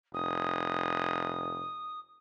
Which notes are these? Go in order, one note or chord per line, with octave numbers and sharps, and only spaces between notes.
F1 D#6